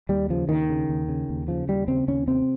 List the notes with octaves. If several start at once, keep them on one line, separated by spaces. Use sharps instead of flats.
D#2 G3
C#3 F3
D#2 D#3
C#3
D#2
C#3
D#2
C#3 F3
D#2 G3
C#3 C4
D#2 C#4
C3 C4